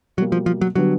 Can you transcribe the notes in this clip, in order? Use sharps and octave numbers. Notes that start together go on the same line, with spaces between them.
B2 F#3 G3 A#3
F3
F3
F#3
D3 F#3 G3 B3 D4